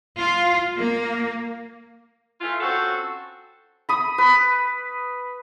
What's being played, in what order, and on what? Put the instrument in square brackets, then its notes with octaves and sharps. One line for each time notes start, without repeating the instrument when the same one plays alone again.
[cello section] F4
A#3
[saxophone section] E3 A3 F4
C4 C#4 F#4 A4
[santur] B5 D#6
B4